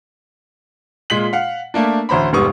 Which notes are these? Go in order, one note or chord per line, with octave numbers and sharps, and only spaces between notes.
A#2 G#3 F4 B6 F#7
F5 F#5
A3 A#3 D4
A1 D2 C5 A#5 B5
F1 G#2 G3 B3 C#6 D#6